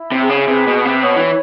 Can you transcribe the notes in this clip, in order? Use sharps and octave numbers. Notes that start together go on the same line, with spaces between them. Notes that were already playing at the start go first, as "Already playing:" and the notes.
Already playing: E4
C3
G#4
C#3
C3 B4
B2
B4
C3
B2 C#5
E3